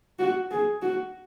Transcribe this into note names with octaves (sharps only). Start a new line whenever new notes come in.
F#4
G#4
F#4